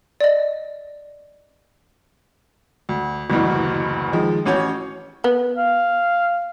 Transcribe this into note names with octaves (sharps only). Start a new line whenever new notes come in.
D5 D#5
D2
F#1 D2 G2 B2 E3
D#3 F3 G#3
A1 C#4 F#4 C#5 G6
B3
F5